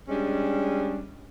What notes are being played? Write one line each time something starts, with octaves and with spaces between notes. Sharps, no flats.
G3 G#3 C#4 D4